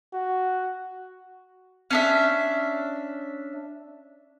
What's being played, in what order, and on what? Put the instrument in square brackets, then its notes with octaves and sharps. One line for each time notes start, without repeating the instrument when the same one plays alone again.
[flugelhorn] F#4
[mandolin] C#4 D4 E5